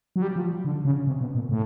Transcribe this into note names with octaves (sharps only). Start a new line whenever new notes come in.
F#3
G3
F3
D3
C#3
C3
B2
A#2
A2